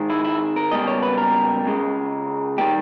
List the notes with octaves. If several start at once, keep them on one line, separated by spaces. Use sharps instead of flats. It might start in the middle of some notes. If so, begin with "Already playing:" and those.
Already playing: G#2 D#3 G#3
E4
E4
A#4
C#2 B2 G3 A#3 D#5
C#5
B4
A#4
C#2 C#3 G#3
D#3 G3 A#3 G4